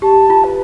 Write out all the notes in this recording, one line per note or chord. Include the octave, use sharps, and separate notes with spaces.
G4 A5
F4
B4